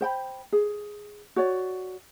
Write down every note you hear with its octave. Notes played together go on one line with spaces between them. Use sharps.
C5 G5 B5
G#4
F#4 C#5 D5